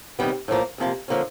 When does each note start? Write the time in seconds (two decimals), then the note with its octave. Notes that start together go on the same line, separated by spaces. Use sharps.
0.19 C3 D#3 G3 B3
0.48 A2 F3 A#3
0.78 D2 C3 F3 A#3
1.08 D3 F3 A#3 C#4